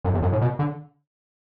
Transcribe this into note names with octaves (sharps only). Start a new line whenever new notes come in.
F#2
E2
F#2
A2
B2
D3